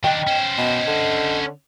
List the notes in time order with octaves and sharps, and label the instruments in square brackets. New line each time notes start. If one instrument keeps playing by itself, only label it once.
[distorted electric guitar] D#3 D4 [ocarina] D#5 [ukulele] G5
[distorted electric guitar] C#4 C5
[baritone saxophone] B2 [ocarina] D#5
[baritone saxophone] D3